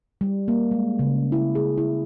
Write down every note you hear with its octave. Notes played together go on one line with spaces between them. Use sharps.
G3
A#3
G#3
C#3
E4
G#4
E4